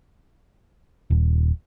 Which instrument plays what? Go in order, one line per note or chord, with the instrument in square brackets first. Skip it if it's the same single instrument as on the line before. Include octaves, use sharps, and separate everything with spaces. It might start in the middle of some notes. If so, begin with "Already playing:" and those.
[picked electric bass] D#1